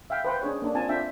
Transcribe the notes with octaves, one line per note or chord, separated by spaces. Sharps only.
E5 F5 G5
B4 C5 F#5 G5
C#4 D4 G#4 C#5
A#3 D4
C4 F4 G#5 A5
C4 D4 F4 E5 G5